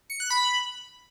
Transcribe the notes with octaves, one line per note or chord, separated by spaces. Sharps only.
C#7
F#6
B5